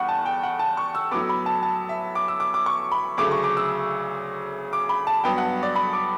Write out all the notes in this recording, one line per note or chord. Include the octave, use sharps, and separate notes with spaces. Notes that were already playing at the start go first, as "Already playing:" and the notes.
Already playing: E2 G3 F#5 C#6
A5
G5
F#5
A5
C#6
E6
A2 F#3 B3 D6
B5
A5
A5
E5
D6
E6
D6
D6
C#6
B5
D2 C#3 F#3 A3 D6
C#6
D6
E6
D6
B5
A5
G2 F#3 B3 G5
F#5
D5
B5
D6